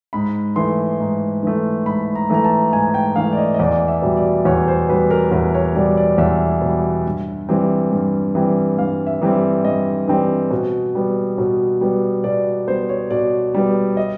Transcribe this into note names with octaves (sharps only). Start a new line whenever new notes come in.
G#2 B5
E3 A3 C6
G#2
E3 A3
G#2 B5
A#5
E3 A3 A#5
A5
G#2 G#5
G5
E3 A3 F5
D5
D#5
D#5
E2 D5
E5
B2 G3
D5
E2 C#5
C5
B2 G3 B4
A#4
E2 B4
C#5
B2 G3 D5
D5
E2 E5
B2 G3
G2
E3 G3 C4
G2
E3 G3 C4
G2 F5
E5
E3 G3 C4
G2 D#5
E3 G3 C4
B2
G3 B3
B2
G3 B3
B2 D5
G3 B3 C5
C#5
B2 D5
G3 B3
D#5